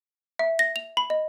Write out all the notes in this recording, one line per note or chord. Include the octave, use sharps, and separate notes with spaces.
E5
A#6
F7
B5
D#5